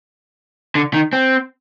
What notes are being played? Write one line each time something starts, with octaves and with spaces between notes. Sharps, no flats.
D3
D#3
C4